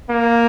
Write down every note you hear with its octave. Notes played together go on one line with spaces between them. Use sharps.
A#3